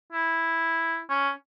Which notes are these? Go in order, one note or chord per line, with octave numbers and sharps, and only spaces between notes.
E4
C#4